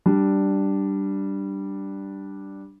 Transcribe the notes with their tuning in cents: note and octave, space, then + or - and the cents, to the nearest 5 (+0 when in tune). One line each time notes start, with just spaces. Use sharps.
G3 -5 D4 +0